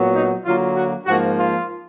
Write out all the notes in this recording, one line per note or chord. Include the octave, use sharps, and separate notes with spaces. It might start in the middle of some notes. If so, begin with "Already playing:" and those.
Already playing: A#2 F#3 B3
D#4
D3 F#3 A#3 F4
F#4
G#2 F3 A#3 F#4
F4